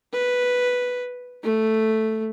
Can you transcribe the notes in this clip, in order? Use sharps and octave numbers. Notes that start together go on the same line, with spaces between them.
B4
A3